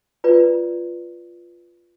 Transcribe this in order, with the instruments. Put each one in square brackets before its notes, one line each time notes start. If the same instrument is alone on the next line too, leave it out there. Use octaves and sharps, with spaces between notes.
[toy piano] F4 B4 D5